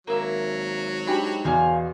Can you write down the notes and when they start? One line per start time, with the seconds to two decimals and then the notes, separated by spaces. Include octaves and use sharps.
0.07 G#1 F#3 A#3 E5 A#5
1.07 G#2 D4 G4 G5 B5
1.45 E2 B2 C5 F5 G#5